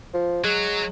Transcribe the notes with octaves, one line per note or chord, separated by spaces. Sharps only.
F3
F#3 G#3